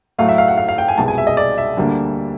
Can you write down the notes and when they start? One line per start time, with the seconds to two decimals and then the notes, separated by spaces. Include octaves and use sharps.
0.18 A2 F#3 A3 F5
0.28 E5
0.38 F5
0.48 F#5
0.58 F5
0.69 F5
0.78 G5
0.88 G#5
0.98 C2 B2 G#3 A5
1.08 G#5
1.18 E5
1.27 D#5
1.37 D5
1.58 E5
1.77 D2 D3 G3 A#3 D4